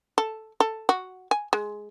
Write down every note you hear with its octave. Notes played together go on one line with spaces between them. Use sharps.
A4
A4
F#4
G#5
G#3